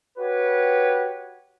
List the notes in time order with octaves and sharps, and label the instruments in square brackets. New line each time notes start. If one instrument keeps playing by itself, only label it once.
[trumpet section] F#4 G4 B4 C#5